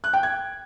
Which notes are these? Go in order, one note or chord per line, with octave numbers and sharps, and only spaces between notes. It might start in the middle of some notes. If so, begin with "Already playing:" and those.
F#6
G5
G#6